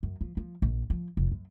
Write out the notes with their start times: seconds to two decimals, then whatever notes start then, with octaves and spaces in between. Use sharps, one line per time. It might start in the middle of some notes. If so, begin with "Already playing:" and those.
0.03 F#2
0.21 F3
0.37 F3
0.62 A#1
0.90 F3
1.17 F1
1.31 F#2